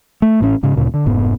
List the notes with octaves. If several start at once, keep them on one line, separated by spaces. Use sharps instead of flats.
A3
A1 A2 B3 C#4
G#2 C#3
D2 A#2 C#3
D3
F1 G#2 B3